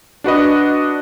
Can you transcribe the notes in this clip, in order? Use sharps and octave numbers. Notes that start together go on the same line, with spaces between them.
D4 F#4 B4 D#5